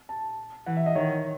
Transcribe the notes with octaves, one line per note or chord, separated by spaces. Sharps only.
A5
E3 F#5
E5
D#5
D#3 C#5